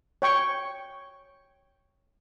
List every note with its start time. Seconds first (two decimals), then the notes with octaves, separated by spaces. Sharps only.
0.22 C#5 G5 C#6